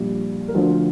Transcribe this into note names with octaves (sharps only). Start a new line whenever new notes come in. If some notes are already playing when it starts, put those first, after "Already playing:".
Already playing: A#1 A#2 G3
A#4
D2 D3 F3 C5